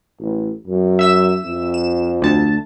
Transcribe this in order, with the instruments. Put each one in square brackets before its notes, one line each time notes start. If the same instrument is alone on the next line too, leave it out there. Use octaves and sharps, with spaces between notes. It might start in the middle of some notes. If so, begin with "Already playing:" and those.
[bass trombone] A1
F#2
[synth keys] E5 E6 E7
[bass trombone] F2
[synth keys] E7
D2 A5